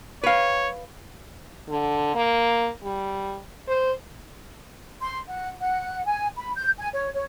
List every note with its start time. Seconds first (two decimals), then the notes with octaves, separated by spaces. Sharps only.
0.24 B4 C#5 F5
1.69 D3
2.15 A#3
2.84 G3
3.68 C5
5.00 C6
5.27 F#5
5.61 F#5
6.06 G#5
6.37 B5
6.55 G6
6.77 G#5
6.93 C#5
7.14 C#5